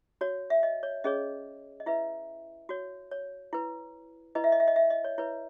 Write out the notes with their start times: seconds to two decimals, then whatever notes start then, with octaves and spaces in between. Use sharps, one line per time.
0.21 F#4 C#5
0.50 E5
0.63 D#5
0.83 C#5
1.04 C#4 G#4 C#5 D#5
1.80 D#5
1.86 E4 B4 E5
2.69 F#4 C#5
3.11 C#5
3.53 E4 B4
4.35 E4 B4 D#5
4.44 E5
4.52 D#5
4.60 E5
4.68 D#5
4.76 E5
4.90 D#5
5.04 C#5
5.18 E4 B4 C#5